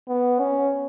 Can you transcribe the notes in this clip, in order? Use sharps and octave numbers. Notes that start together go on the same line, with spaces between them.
B3
C#4